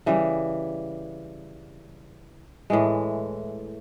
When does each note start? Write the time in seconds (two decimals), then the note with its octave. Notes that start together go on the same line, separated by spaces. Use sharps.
0.06 C#3 E3 G3
2.70 A2 E3 G#3